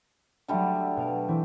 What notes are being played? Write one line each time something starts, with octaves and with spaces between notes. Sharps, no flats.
D3 F#3 G3 A3 D#7
E5
B2 F5 D7
E3 C4